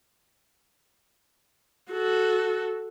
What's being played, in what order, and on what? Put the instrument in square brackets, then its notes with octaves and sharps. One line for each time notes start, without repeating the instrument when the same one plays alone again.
[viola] F#4 A4